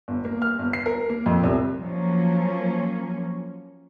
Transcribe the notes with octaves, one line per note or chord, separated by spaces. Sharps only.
G1
A#3
F6
G1
C7
A#4
A#3
F2
C2
F3 F#3 A#3 C#4